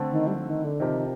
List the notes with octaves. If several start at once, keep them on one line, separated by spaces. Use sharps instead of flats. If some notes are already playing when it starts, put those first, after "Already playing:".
Already playing: D3 A3 C4
D#3
G3
F3
D#3
D3
C3 D#3 F3 C4 G4 A#4